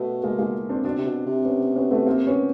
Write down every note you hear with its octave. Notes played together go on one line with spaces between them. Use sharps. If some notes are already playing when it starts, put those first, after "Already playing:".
Already playing: B2 A3 B3
G#3 A#3
G#3 A#3
C4 D4
B2 C4 D4
C3
B2
C3
B3 C#4
B3 C#4
A3 B3
A#3 C4
B3 C#4